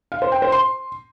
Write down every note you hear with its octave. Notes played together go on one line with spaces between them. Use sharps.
F5
C5
G5
C5
C6